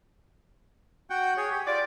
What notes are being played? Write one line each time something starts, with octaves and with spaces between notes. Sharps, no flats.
F#4 F#5 G5
G#4 C#5
G4
F4 D5